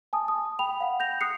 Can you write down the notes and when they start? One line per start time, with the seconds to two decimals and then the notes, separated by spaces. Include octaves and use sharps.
0.13 G#5 A5 D#6
0.28 D#6
0.59 G5 B5 F7
0.81 F5 F#5
1.00 G6 A#6 F7
1.21 D#6 F#6 C7 C#7